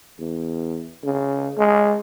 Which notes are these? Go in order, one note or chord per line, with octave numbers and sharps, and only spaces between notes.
E2
C#3
G#3